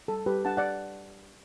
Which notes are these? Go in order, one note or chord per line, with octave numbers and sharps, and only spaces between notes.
G3 A4
G3 G4 B4
D4 F#5 A5
D5 F#5